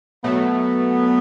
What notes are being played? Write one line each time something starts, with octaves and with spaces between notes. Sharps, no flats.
B2 F#3 A3 B3